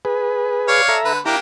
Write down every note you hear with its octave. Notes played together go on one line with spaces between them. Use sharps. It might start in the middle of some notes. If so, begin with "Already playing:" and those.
G#4 B4
C#5 D5 F5
A4 E5 A#5
D3 B4
A#3 D4 E4 G4 A#5